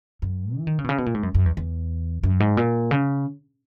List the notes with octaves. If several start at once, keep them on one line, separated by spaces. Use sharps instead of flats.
F#2
E3
D#3
C#3
B2
C#3
B2
A#2
G#2
F#2
F#2
E2
E2
F#2
G#2
A#2
C#3